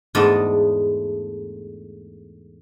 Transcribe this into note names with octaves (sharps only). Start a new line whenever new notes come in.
E2 G#2 A3 D4 D5 D#5